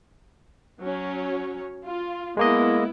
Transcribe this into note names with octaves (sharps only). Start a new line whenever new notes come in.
F#3 C#4 C#5
F4
G#3 A#3 B3 E4 D#5